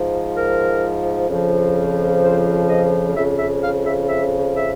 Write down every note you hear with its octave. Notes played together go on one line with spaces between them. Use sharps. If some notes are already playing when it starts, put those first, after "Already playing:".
Already playing: G#2 F3
A#4
F2 C#3 F3
C5
D#5
F2 C#3 F3 E5
E5
F5
E5
E5
E5